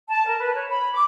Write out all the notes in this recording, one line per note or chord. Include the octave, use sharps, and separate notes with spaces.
A5
A#4
B4
C#5
B5
D6